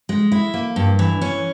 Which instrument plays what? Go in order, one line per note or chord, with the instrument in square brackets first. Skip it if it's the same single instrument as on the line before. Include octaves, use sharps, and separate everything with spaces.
[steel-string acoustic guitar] G#3
E4
A#3
G2
E3
C#4